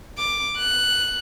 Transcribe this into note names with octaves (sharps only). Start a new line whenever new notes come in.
D6
F#6